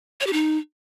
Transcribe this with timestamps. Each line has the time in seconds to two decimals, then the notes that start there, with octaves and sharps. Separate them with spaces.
0.21 C#5
0.27 G4
0.33 D#4